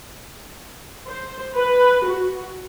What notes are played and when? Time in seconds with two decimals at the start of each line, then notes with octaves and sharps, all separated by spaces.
1.07 C5
1.56 B4
2.06 F#4